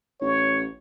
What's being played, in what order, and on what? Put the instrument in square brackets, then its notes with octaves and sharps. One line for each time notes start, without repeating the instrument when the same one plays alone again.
[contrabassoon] A1 [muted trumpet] C#5